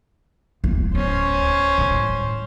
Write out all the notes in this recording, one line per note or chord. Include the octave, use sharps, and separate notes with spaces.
D1 B3
C#4 C5
A2 G3